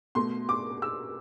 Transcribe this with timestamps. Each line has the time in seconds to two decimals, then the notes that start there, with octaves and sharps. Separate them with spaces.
0.15 B2 A3 C6
0.49 D6
0.82 E6